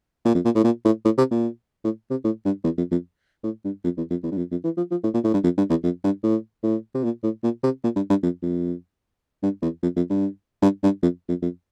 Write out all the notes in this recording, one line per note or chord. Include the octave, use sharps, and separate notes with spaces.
A#2
F2
A#2
A2
A#2
A2
A2
C3
A#2
A2
C3
A2
G2
E2
F2
F2
A2
G2
F2
E2
F2
E2
G2
F2
F2
E3
F3
F3
A2
A#2
A2
G2
F2
G2
E2
F2
G2
A2
A2
C3
A#2
A2
A#2
C3
A#2
G2
G2
F2
F2
G2
E2
F2
F2
G2
G2
G2
F2
F2
F2